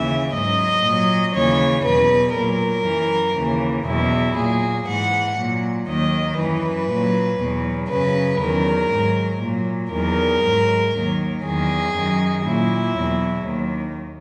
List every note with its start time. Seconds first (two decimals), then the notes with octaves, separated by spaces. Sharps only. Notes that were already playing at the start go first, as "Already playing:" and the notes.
Already playing: D#2 C#3 E3 E5
0.32 G#2 F#3 D#5
0.83 A#2 F#3
1.33 D#2 C#3 E3 C#5
1.84 E2 B2 F#3 B4
2.34 A#2 F#3 A#4
2.85 F#2 E3
3.35 D#2 C#3 E3
3.86 E2 B2 F#3 E4
4.36 A#2 F#3 G#4
4.87 G#2 E3 F#5
5.37 A#2 F#3
5.88 D#2 D#3 F#3 D#5
6.38 F#2 E3 B4
6.89 A#2 F#3
7.39 E2 B2 F#3
7.90 F#2 C#3 F#3 B4
8.40 E2 D#3 F#3 A#4
8.92 G#2 F#3
9.41 A#2 F#3
9.92 E2 D#3 F#3 A#4
10.42 G#2 F#3
10.93 D#2 D#3 F#3
11.44 E2 D#3 F#3 G#4
11.94 F#2 D#3 F#3
12.45 A#2 F#3 E4
12.95 E2 B2 F#3
13.45 D#2 D#3 F#3